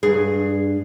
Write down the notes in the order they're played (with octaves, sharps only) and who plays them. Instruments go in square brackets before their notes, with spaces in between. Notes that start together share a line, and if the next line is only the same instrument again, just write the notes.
[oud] G2 G#4